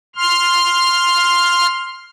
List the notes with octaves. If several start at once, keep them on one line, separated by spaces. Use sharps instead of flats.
C6 F6